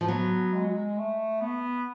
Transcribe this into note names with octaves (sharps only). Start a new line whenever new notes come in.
F3
F#3 B3
G#3
A3
B3